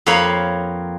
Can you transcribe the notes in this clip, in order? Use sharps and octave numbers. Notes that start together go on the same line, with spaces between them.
F2 A#3 C#5 F5 B5